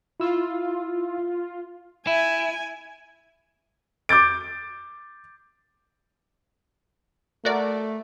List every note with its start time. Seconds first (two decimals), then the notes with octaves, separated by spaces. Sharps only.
0.20 E4 F4 E6
2.07 E4 E5 G#5
4.09 D6 G6 A6 D7
7.45 A3 F#4 A#4 D5